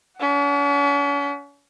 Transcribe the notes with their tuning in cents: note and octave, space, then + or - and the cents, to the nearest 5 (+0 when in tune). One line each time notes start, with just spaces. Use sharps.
C#4 +45 F#5 +25